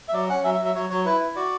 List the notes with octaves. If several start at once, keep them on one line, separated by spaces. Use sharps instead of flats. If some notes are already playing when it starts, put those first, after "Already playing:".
E5
F#3 D5
C#4 F#5
F#3 E5
E5
F#3
E5
F#3 C#5
F#3 C#5
E4 B4
E4
F#4 D5